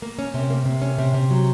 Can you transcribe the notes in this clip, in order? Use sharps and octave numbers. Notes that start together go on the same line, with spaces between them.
A#3
C#4
C3
A#3
C3
C#4
C3
C3
F#3